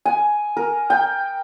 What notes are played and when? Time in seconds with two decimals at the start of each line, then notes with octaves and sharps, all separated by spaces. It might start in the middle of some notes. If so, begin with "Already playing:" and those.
0.05 G#5
0.57 A#4
0.90 G5